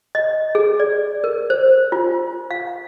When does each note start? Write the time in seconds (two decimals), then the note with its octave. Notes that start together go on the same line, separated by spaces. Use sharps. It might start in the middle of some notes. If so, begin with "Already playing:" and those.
0.15 D#5
0.55 G#4
0.80 D5
1.24 A#4
1.50 C5
1.92 F4
2.51 F5